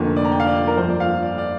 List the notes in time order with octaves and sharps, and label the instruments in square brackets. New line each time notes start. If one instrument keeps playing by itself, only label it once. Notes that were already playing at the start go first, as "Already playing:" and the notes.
Already playing: [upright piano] F1 F2 D3 A#3
D5
A#5
G5
F5
D5
A#4
G1 F2 F3 A#3 C5
D5
F5
D5
D5